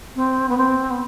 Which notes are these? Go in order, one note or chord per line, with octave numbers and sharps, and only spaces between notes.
C4
B3
C4
B3